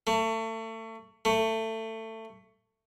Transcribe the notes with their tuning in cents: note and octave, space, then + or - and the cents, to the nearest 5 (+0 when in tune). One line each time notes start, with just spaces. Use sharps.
A3 +30
A3 +20